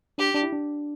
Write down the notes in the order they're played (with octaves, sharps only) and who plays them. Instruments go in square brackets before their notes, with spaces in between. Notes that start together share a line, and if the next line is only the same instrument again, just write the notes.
[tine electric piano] D4 [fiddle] G4
[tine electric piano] D4
E4
D4